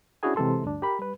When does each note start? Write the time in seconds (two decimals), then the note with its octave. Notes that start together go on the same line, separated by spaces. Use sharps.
0.23 C#4 D4 E4 F#4 G#4 G#5
0.36 C3 E3 G#3 A4 C6
0.63 D2 G2 D4
0.82 G4 A#4 B5
0.99 G3 B4